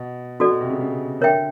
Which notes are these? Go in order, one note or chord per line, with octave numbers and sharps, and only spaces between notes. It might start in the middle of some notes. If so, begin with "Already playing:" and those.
Already playing: B2
B2 F#4 A4 D5
B2
C3
C#3
C#3
D3 A#4 C#5 E5 G5